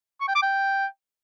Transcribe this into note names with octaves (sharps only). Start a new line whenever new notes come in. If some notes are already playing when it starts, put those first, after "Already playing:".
C#6
G5
D6
G5